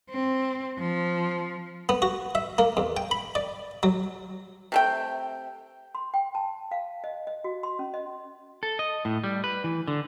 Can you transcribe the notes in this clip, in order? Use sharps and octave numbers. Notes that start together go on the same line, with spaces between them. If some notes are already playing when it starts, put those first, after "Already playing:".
C4
F3
B3
F#4
E5
A#3
E2
G5
B5
D5
F#3
C3 A3 G5
C6
G5
A5
F5
D#5
D#5
F#4
C6
C#4
D#5
A4
D#5
A2
G3
B4
E3
D3